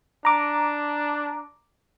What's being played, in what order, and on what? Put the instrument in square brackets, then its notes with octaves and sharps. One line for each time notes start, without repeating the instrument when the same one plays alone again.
[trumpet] D4 [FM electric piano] A#5 D6